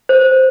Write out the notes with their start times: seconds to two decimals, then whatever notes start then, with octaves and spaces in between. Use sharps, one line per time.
0.09 C5